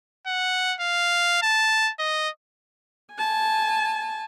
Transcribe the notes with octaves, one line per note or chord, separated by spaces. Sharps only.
F#5
F5
A5
D#5
G#5 A5